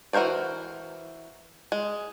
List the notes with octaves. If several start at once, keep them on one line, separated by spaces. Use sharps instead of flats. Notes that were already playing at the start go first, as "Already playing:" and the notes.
E3 F#4 A#4 C5 D5
G#3